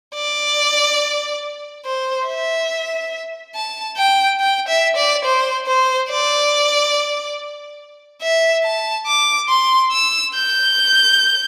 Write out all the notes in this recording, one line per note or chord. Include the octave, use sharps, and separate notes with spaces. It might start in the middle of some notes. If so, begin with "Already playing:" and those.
D5
C5
E5
A5
G5
G5
E5
D5
C5
C5
D5
E5
A5
D6
C6
E6
G6